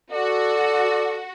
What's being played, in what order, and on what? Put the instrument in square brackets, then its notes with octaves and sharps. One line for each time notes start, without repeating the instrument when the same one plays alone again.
[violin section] F#4 [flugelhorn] A4 [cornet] D5